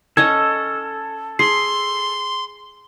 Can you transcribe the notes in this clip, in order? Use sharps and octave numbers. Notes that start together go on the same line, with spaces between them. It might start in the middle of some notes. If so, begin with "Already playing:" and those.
C#4 A4 C#5 D#5 G#6
G#4 C6 C7